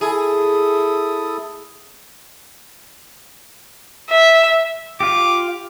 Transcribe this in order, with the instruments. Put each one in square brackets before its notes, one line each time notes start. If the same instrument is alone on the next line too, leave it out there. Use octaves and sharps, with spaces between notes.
[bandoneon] E4 A4 D#6 [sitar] G#4
[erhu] E5
[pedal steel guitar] F4 G4 [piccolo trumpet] D6